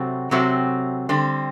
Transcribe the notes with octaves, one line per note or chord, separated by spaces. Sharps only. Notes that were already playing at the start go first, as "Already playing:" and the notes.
Already playing: C3 F#3 A3 C4 F#4
C3 F#3 A3 C4 F#4
D3 G3 C4